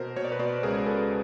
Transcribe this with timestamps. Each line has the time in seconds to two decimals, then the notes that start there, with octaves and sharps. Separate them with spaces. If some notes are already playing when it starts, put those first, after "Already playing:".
Already playing: B2 A#4 C5
0.16 B2 C#5
0.24 D5
0.32 B4 C#5
0.39 B2 C5 D5
0.63 C#2 G#4 A#4
0.86 C#2 A4 B4